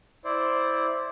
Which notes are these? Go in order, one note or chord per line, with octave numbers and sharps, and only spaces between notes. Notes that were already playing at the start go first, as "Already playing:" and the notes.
E4 C5 D5